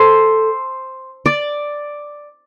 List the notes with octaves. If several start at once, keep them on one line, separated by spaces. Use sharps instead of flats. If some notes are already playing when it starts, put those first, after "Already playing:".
Already playing: A4 C5
D5